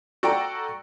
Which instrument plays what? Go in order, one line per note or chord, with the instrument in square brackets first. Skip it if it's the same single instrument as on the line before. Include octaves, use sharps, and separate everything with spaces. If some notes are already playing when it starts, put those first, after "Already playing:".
[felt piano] F#4 A4 D5 G5 A#5 D7